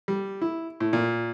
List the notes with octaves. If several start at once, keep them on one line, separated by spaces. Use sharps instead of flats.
G3
E4
A2
A#2